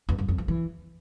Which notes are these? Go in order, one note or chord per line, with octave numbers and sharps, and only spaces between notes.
E2
F#2
F2
F3
E3